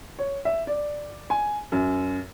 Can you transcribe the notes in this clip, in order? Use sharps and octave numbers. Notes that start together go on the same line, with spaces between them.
C#5
E5
D5
G#5
F#2